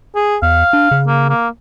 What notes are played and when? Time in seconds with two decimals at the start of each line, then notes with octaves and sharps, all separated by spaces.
0.15 G#4
0.42 E2 F5
0.73 D4
0.91 C#3
1.07 A#3
1.29 A#3